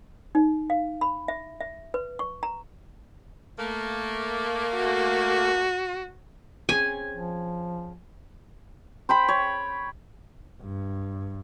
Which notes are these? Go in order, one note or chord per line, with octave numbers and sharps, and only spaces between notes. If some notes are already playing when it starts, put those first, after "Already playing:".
D#4
F5
B5
E5
E5
B4
C#6
A#5
A3 A#3
F#4
C4 C#4 G#4 G#5
F3
C5 G5 B5
C#5
G2